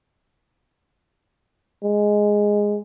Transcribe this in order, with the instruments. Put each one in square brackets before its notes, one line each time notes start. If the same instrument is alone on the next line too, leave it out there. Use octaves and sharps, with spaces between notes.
[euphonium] G#3